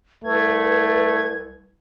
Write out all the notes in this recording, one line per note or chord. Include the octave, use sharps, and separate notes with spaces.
C2 A3 B4 G#6